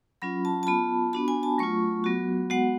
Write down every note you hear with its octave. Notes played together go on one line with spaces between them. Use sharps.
F#3 C#4 F4 B5
A5
A5
B3 F4 B5
B3 D4 F#4 B5
G#5
A5
F#3 A3 F4 C#6
F#3 B3 F#4
G#3 B3 F#4 F#5